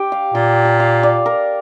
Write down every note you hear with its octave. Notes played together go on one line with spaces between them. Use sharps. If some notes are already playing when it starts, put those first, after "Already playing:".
Already playing: G4
F5
A#2 G5
A5
F5
D5
A#4